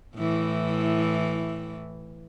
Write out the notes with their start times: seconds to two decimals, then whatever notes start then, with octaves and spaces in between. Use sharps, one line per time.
0.16 A2 E3